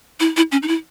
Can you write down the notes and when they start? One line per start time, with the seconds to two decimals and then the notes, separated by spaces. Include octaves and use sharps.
0.20 E4
0.37 E4
0.52 C#4
0.62 D#4
0.68 E4